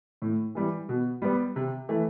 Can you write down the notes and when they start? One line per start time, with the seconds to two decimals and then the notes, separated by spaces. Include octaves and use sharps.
0.22 A2
0.55 E3 G3
0.89 B2
1.22 G3 B3
1.56 C3
1.89 E3 A3